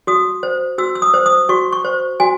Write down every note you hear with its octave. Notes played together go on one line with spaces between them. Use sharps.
F#4 D#6
C5
F#4 E6
E6
D#6
C5
D#6
F#4 C#6
C#6
C5
F#4 G#5